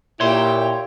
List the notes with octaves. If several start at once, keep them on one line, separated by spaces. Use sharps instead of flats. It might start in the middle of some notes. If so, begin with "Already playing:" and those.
A#2 E4 G4 C#5 G5 C6